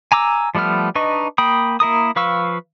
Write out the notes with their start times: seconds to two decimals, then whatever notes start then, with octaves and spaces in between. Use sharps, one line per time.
0.12 G#5 A#5 D6 E6
0.55 F3 G3 A3 B3 F6
0.95 D4 D#4 B4 D#5 C#6
1.38 A#3 G5 B5 D#6
1.80 A#3 E4 A#4 D#6
2.16 F3 B4 F5 C#6 E6